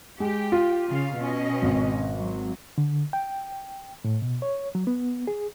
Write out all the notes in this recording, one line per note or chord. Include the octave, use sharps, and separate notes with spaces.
G#3 G4
F4
C#3 F5
B2 C#4 D#5
G#1
F#3
D3
G5
A2
B2
C#5
F#3
B3
G#4